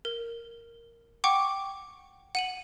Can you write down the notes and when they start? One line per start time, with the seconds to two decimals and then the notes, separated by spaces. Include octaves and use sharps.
0.05 A#4
1.24 F#5 G5 C#6 D6
2.35 F#5 D#7 F#7